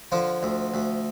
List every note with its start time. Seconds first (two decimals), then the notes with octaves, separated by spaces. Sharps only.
0.12 D3 F3 F4
0.43 D2
0.74 D2